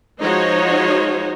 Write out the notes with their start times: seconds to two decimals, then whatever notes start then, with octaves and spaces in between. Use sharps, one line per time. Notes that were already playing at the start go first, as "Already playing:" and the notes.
0.21 F3 G#3 D#4 F#4 C5 C#5